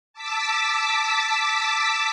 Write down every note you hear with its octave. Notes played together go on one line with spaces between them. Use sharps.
A5 D6 E6 B6